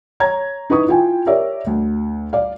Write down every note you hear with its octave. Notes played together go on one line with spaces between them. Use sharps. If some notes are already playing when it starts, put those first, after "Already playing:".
C#5 A#5 G#6
D#4 E4 B4 C#6 D#6
E4 F4 G5 G#5
G4 A#4 C#5 D5 E5
D2
D5 F5